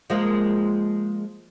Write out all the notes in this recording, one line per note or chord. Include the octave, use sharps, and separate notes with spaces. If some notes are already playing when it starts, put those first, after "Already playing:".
F3 G#3 A#3